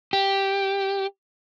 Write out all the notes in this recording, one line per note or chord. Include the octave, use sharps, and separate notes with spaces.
G4